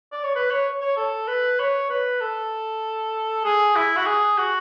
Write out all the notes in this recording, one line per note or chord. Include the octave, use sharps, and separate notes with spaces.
D5
C#5
B4
C#5
C#5
A4
B4
C#5
B4
A4
G#4
E4
F#4
G#4
F#4